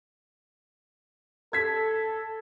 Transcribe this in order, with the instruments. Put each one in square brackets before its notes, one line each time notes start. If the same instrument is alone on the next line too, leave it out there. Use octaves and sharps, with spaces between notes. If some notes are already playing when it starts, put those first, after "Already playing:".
[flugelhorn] A4 [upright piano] G#6 B6